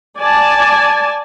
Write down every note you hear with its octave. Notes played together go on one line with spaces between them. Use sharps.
D5 G#5 A5